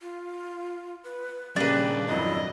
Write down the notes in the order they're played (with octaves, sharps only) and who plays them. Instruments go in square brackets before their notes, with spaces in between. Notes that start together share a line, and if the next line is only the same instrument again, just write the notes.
[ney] F4
B4
[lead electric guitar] A#2 G3 [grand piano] C#3 A#3 [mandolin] D4 B4 [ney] G4
[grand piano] G#1 F2 F#3 [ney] E4 [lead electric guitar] D#5